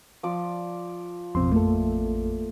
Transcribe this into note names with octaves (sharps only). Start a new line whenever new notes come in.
F3 D5
A1 F2 B2 C4 C6
A3 A#3 A4